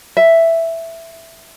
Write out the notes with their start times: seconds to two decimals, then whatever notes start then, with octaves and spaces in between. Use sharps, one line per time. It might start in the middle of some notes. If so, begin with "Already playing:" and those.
0.17 E5